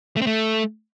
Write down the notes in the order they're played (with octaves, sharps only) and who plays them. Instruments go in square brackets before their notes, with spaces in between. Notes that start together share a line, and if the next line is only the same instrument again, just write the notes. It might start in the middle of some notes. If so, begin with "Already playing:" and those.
[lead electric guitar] A3
C4
A3